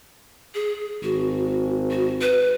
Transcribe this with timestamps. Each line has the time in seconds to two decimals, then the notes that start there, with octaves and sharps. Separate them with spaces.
0.55 G#4
1.03 G#1 F#4
1.90 F#4
2.21 B4